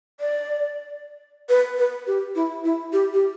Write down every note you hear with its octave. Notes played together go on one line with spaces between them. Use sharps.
D5
B4
B4
G4
E4
E4
G4
G4